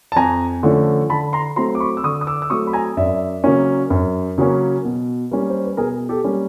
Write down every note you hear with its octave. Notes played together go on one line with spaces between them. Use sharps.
A5
F2 G#5 A#5
D3 F3 A3 C#4
D3 A5 B5
A#5 C6
F#3 A3 C4 A#5 C6
D6
B5 C#6
E6
D3 C#6 D#6
D#6
D6 E6
E6
F#3 A3 C4 C#6 D#6
B5
G#5 A#5
F#2 D5 E5
C#3 F#3 A#3 C#4
F#2
C#3 F#3 A#3 C#4
B2
G3 A#3 C#4
C5
B4
B2 G#4 A#4
G4 A4
G3 A#3 C#4